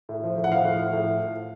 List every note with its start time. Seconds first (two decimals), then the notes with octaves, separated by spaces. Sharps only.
0.09 A2
0.24 F3
0.38 A2
0.44 F#5
0.51 F3 F5
0.65 A2
0.79 F3
0.93 A2